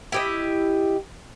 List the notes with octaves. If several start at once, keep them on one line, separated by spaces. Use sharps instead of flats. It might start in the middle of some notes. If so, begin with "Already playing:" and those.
E4 G4 D#5